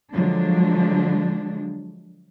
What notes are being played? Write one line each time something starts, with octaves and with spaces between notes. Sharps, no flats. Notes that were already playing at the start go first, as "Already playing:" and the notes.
D3 F3 F#3 G#3 D4